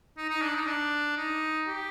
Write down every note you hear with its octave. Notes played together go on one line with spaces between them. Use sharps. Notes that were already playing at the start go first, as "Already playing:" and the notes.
D#4
D#4
D4
D#4
D4
D#4
G4